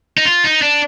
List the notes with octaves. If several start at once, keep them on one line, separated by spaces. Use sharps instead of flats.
D#4
F4
D#4
D4